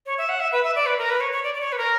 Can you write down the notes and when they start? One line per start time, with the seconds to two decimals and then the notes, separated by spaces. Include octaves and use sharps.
0.06 C#5
0.18 E5
0.29 F#5
0.40 E5
0.52 B4
0.64 E5
0.76 D5
0.86 B4
0.98 A#4
1.10 B4
1.21 C#5
1.32 C#5
1.44 D5
1.54 D5
1.60 C#5
1.72 B4
1.78 A#4